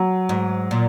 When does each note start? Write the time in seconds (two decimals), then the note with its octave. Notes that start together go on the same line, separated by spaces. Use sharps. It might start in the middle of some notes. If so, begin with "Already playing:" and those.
Already playing: F#3
0.29 G#2
0.71 A#2